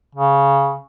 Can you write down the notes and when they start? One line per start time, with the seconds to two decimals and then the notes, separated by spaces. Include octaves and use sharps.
0.15 C#3